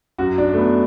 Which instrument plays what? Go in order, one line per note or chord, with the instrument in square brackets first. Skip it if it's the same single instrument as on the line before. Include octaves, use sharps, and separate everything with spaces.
[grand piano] F#2 F#3 F#4
D4
A3
B3